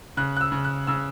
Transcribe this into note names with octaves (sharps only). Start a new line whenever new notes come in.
C#3 F#6
F#6
E6
C#3
F#6
C#3 E6